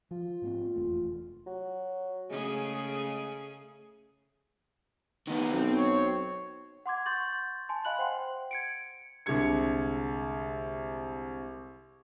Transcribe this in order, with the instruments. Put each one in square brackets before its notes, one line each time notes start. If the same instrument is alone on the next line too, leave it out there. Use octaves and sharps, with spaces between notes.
[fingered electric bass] F3 [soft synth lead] F4
[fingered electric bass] G#2 A#3 C4
F1 E2 A3
[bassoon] F#3
[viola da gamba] C#3 A3 G#4 [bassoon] G#3
[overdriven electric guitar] D#3 B3
[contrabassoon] B1 [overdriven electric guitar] C4
[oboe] C#5
[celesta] F#5 C6 D6 G#6
C6 C#6 G6 A6 F#7
G#5 A5 C6
D#5 F5 G#5 B5 F#6 F#7
C5 F#5 G5 C6
G#6 C#7 D7
[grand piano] C2 D3 G#3 G#6 C#7